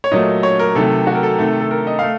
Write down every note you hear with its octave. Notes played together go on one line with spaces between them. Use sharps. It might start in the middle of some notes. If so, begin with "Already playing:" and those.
C#5
A#2 F#3 A3 D#5
C#5
A#4
C3 D#3 F#3 A3 A4
F#4
A#4
A4
C3 D#3 A3
A4
A#4
D#5
A3 F5